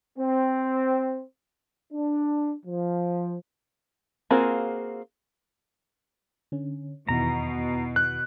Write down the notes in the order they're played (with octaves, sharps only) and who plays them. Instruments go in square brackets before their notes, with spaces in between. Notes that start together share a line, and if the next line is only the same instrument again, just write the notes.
[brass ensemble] C4
D4
F3
[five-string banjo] A#3 C4 F4 F#4 G#4
[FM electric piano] D3 C#4
[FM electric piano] E2 D#3 E4 [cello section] B2 [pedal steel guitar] A#5
[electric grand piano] F#6